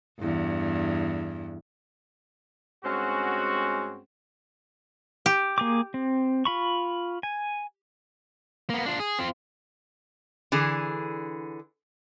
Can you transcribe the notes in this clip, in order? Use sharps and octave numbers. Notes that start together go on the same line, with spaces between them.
E2 G2
G2 G#3 C4 C#4 F#4
G4
A#3 G#4 D6
C4
F4 B5 C#6
G#5
A#3 B3
D4 F4
G#4
C4 F4
D3 E3 G#4